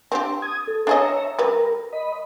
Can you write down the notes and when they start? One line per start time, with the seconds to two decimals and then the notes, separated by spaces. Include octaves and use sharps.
0.12 C4 D4 G4
0.42 D#6 G#6
0.67 A4
0.87 D4 G#4 C#5 D#5 E5 A#5
1.39 G3 A#4 B4
1.93 D#5 B5